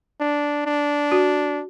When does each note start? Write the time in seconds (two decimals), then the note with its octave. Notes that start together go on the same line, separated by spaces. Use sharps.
0.20 D4
0.66 D4
1.12 F#4